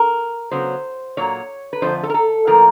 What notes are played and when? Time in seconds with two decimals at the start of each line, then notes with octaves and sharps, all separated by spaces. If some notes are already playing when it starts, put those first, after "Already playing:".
Already playing: A#4
0.51 C#3 F#3 B3 C5
1.17 A#2 F#3 A#3 C#5
1.73 B4
1.82 F2 D3 F3 A3 C5
2.03 A4
2.10 A#4
2.14 A4
2.47 A2 F3 A#3 A#4